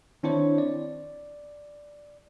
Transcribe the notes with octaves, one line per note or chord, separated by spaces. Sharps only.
D#3 C4 D4 E4 C5 C#5
D5